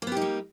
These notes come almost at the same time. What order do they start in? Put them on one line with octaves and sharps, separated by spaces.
A#3 B3 G4 D#4 G3